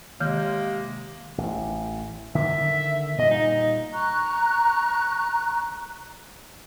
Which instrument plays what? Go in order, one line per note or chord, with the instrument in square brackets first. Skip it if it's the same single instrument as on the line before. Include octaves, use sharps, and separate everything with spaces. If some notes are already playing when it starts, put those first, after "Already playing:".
[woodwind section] C3 G#3 A#3 [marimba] D#3 F6 G6
[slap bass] A1
[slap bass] D3 D#3 A#3 [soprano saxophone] E5
[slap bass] A#2 G3 [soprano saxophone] D#5
[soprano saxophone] D#4
[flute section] A#5 C#6 F#6